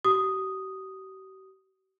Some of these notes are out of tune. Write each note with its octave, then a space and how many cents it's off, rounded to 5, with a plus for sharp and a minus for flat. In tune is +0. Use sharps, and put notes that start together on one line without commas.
G4 -45 D#6 +0